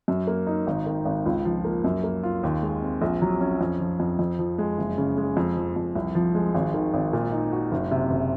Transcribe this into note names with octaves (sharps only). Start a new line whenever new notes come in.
F#2
A#3
D#4
G#1
D#3
G#1
C#2
F3
A#3
F#2
A#3
F4
D#2
G#3
C4
A#1
F#3
C#4
F2
F3
F2
F2
F3
G#3
F#1
C#3
G#3
F2
F3
F2
C2
F3
G#3
G#1
D#3
G#1
A#2
D#4
F#4
F#1
C3
F#1